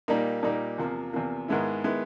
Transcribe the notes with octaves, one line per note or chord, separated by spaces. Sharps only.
A#2 G3 A#3 D#4
A#2 G3 A#3 D#4
E2 C3 F3 A#3
E2 C3 F3 A#3
G#2 D#3 G#3 B3 E4
D#3 G#3 B3 E4